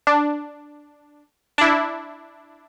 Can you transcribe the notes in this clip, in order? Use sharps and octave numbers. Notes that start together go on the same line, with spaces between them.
D4
D4 E4